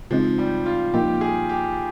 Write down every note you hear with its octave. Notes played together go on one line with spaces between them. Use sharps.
C#3 F3 G#3 C4 D#4
G3
F4
A#2 F3 A#3 D#4 G4
G#4
G4